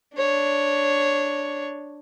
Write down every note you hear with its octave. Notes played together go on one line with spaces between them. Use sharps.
D4 C#5